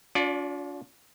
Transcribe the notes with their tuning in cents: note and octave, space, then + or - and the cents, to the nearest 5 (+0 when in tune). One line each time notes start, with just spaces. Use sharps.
D4 -40 F4 +40 D5 +0